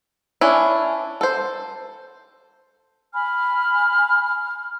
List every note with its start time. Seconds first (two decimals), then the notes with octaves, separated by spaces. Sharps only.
0.41 C#4 D4 E4
1.21 A4 C5
3.14 G#5 B5 F6